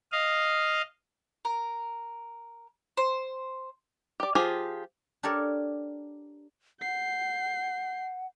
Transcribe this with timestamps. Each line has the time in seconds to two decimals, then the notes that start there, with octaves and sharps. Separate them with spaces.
0.12 D#5 F5
1.45 A#4
2.97 C5
4.20 G4 D5
4.35 F3 F4 G4 G#4 G#5
5.23 D4 G4 A4 A#4 C#5 D5
6.81 F#5 G6 C7